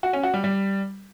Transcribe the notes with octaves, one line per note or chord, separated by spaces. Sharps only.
F#4
C#4
F#4
G3
G3